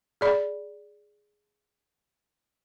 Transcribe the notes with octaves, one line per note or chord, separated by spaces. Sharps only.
G#4 D5 B5